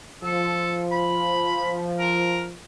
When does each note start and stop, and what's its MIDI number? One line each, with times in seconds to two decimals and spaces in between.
0.23 2.57 53
0.23 0.82 69
0.92 1.78 83
1.99 2.43 70